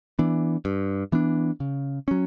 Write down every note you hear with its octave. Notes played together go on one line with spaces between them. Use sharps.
E3 B3 D4
G2
E3 B3 D4
C#3
F#3 C#4